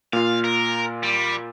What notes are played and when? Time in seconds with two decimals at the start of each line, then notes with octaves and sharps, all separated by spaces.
0.13 A#2 F4 F5
0.44 A#4
1.03 G3